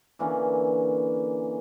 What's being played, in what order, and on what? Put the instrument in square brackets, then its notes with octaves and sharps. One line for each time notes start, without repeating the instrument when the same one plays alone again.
[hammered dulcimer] D3 E3 A#3 C#4